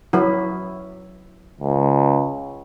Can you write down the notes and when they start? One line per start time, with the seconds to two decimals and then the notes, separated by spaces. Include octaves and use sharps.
0.13 F#3 E4
1.61 C#2